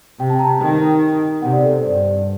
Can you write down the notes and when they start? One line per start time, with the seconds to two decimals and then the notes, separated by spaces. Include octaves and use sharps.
0.19 C3 G5
0.30 A5
0.39 A#5
0.50 G5
0.60 D#3
1.42 C3 F#5
1.53 D5
1.63 A4
1.72 C5
1.83 G2 D5